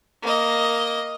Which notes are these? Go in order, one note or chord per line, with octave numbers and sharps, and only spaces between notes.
A#3 D#5